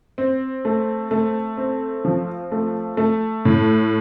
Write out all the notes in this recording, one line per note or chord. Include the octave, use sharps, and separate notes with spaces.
C4
A3
A3
C4
F3
A3
A3
A2